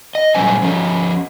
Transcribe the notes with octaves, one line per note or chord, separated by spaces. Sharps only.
D#5
A#2 F#3 G3 C#4 C5 G#5
F3 C#4